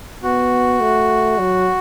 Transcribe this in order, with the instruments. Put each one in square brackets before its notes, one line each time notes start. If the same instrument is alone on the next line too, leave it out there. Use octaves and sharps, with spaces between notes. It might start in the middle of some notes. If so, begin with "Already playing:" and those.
[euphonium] B3 [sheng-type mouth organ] F#4
[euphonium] A3
F#3